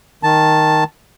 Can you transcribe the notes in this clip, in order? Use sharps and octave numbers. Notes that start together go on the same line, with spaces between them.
D#3 A5